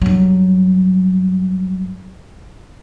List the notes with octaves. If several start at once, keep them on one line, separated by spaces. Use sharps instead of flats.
G2 F#3